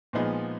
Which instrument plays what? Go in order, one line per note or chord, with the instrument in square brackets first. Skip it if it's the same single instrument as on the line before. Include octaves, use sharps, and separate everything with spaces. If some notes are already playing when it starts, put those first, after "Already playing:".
[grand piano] A#2 F3 G#3 B3 D#4